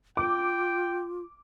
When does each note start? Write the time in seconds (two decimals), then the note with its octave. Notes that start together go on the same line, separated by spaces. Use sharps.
0.17 F4 G5 D6